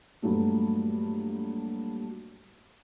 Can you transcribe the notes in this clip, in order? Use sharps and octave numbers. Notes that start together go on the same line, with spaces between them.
G2 A#2 F#3 A3